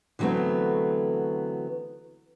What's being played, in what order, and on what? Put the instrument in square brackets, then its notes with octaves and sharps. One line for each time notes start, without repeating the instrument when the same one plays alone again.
[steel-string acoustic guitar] D3 E3 F#3 A3 B3 C4